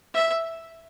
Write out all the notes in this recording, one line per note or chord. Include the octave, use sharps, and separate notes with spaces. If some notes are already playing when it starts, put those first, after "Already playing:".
E5